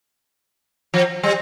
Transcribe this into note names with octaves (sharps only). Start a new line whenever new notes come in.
F3
G3